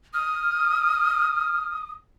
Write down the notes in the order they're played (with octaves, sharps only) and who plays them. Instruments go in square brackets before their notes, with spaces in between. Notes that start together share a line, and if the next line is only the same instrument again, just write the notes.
[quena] D#6 [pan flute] F6